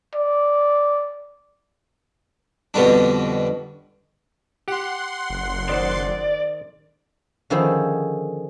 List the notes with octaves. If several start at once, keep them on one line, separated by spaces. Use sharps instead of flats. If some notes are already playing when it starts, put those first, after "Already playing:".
D5
F2 B2 D3 G3 D4
G4 F#5 C6
F#1
D#3 C5 D5
D3 D#3 F3 C#4 E4 G#4